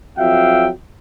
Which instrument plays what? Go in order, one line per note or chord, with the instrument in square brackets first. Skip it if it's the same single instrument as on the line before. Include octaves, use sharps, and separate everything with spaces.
[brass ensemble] F2 F#3 E5 F5 G5